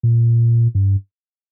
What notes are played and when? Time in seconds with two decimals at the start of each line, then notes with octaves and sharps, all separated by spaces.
0.03 A#2
0.75 G2